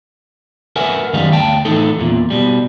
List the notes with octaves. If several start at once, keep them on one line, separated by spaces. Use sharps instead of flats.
A#4 B4 E5 F#5 G#5
F#2 D#3 G3 G#3 F5
D2 G5 A5
A2 E3 D#4 A4
E2 A#2
B2 G3